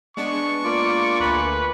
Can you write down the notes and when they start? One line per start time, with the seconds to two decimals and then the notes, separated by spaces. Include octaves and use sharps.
0.17 G#3 B3 D4 C#6
0.64 A#3 F4 D5
1.20 D2 B4 G#5